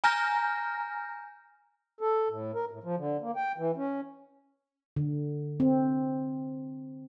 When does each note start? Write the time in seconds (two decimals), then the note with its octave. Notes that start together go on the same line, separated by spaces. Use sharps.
0.04 G#5 A#5 F6 G6 A#6
2.01 A4
2.29 A2
2.55 A#4
2.71 A2
2.84 F3
2.97 D3
3.21 A#3
3.36 G5
3.58 E3
3.76 C#4
4.96 D3
5.60 C4